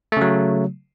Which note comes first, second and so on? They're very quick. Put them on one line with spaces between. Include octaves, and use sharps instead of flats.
A3 C#3 F#3